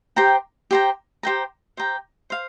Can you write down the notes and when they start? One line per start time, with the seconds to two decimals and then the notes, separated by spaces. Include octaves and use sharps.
0.16 G4 C5 G5 A#5
0.71 G4 C5 G5 A#5
1.23 G4 C5 G5 A#5
1.77 G4 C5 G5 A#5
2.30 C5 F5